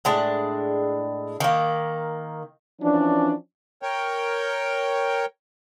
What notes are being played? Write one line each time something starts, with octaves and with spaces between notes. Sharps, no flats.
A2 G#3 D4
D#3 A#3
E3 F3 C#4 D4
A#4 C#5 G5